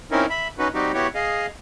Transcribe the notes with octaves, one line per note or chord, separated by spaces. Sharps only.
C4 C#4 D#4 E4 A#4
E5 B5
C#4 D#4 F#4 B4
G3 C4 D#4 F#4 G4
B3 E4 F#4 G4 C#5
G#4 D#5 F5